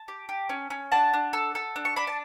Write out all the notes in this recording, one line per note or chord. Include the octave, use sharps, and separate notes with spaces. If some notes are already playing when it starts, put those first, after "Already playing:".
Already playing: A5
G4
G4
C#4
C#4
D4 F#5 A5
D4
A4
A4
D4
C#6
D4 B5
A5